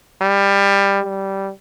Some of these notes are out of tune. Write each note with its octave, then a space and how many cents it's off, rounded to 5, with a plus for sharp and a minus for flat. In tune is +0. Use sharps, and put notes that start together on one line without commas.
G3 +20
G3 -10